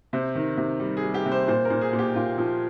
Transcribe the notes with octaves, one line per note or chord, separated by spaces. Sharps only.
C3 C5
D#3
C3
G3
G#4
G3
G4
C3
C5
A#2 C5
A#4
A#2
G#4
A#2
G4
A#2 F4
F3